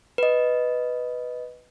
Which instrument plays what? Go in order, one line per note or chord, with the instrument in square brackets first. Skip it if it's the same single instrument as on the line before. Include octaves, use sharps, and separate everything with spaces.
[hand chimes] B4 D#5